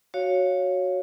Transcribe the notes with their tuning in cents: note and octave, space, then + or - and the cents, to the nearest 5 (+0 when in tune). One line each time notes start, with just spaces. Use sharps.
F#4 +0 C#5 +0 F5 +0